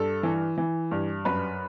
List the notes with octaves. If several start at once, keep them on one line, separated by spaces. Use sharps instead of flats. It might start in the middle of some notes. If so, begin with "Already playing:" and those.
Already playing: G2 A4
E3
E3
G2
F#2 B4